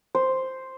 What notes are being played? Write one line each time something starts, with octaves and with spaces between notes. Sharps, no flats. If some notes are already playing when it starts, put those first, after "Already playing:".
C5